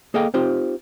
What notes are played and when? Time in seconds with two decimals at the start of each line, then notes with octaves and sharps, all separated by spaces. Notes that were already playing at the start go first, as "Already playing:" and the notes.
0.14 A#3 G#4 A4 D#5 F5 G5
0.34 C4 D#4 F4 G4 C5